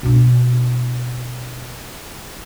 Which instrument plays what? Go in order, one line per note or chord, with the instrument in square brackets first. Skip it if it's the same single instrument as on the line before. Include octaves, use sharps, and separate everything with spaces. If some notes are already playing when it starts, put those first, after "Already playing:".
[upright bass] B2 D4